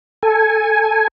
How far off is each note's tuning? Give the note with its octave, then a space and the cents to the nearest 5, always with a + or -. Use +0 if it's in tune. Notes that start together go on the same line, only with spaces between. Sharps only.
A4 +0 G#5 +0